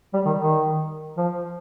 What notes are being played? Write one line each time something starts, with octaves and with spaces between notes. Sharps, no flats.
G3
D#3
D#3
F3